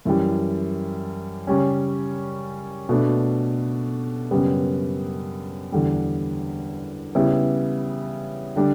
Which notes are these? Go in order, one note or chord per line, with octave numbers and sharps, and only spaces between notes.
F#2 E3 G3
C#3 G3 C#4
B2 A3 D4
F#2 C#3 G3 B3
E2 D3 G3
C#3 G3 B3 E4
D3 G3 D4